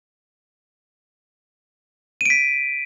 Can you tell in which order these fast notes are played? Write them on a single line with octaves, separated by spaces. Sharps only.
D#7 D7 B6